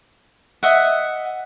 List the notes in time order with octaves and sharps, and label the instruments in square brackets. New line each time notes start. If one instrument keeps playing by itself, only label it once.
[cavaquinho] D#5 E5 F#5